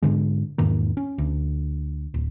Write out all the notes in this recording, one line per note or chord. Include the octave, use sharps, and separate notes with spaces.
G#2 D3 G#3
E2 G#2 D#3 A#3
C#4
D2
D1